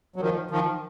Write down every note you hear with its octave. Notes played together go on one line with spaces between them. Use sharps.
F#3
D#3 F3
D#3 F3